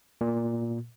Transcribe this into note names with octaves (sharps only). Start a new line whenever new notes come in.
A#2